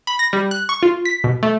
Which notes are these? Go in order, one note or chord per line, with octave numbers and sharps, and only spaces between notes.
B5
A#6
G3
F#6
C#6
F4
B6
B2
A3